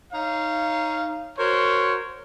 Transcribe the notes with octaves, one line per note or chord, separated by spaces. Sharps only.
D#4 C#5 F5
F#4 A#4 C5 C#5